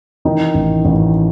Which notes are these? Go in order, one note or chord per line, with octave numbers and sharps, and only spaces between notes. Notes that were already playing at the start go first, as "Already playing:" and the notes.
D#3 E3 D#4
A1
A1